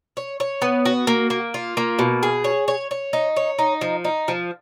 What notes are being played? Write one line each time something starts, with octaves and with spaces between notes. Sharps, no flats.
C#5
C#5
B3
F#4
A#3
A#3
F4
A#3
B2
G#4
C#5
C#5
C#5
D#4
C#5
D#4
F3
D#4
F3